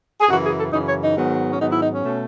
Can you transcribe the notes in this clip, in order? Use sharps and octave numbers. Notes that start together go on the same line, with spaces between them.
G#4
F#2 C#3 E3 F#4
G#4
A4
F#2 C#3 E3 D#4
C#5
D#4
G#2 D#3 F#3 B3
C#4
G#2 D#3 F#3 B3 D#4
E4
D#4
C#4
B2 A3